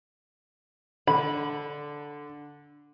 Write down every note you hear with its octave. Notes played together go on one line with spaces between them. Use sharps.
D3 B5